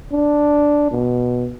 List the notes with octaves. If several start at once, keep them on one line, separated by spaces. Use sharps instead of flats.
D4
B2